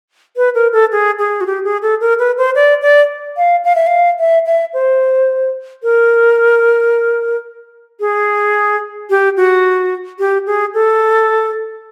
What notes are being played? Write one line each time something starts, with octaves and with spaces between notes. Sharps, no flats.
B4
A#4
A4
G#4
G#4
F#4
G4
G#4
A4
A#4
B4
C5
D5
D5
F5
F5
E5
F5
E5
E5
C5
A#4
G#4
G4
F#4
G4
G#4
A4